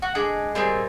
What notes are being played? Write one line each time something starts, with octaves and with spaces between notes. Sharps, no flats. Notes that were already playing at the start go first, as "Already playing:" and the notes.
F#4
G#3 D4 G#4
A#2 G3 C4 G#4